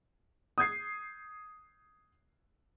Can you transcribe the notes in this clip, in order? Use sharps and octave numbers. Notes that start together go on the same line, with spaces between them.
D#6 G6 G#6 C7